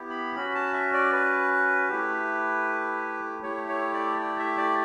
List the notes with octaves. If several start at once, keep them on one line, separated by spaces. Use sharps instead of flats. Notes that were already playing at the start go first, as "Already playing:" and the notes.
Already playing: B3 E4 G4
B5
C#4 F#4 B5
A5
E5
D5
B4
A3 E4 G4
A3 E4 G4 C#5
C#5
D5
D5
E5
D5